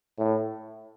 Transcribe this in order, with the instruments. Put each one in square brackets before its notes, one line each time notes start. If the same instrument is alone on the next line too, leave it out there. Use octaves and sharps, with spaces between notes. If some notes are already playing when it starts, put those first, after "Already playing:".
[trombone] A2